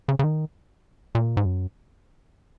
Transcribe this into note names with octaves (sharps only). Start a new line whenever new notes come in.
C#3
C#3
D#3
A#2
G#2
F#2